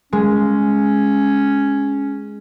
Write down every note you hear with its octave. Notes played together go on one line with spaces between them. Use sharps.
G#3 C#4